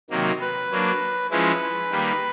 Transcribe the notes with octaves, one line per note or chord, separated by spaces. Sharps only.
C3 D#3 F#3 A#3
B4
F#3 A#3 D4
F3 G#3 C#4 E4 B4
D#3 G3 A#3